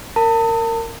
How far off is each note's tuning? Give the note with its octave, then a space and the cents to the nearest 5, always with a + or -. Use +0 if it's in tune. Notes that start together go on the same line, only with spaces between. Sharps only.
A#4 -20 A5 +40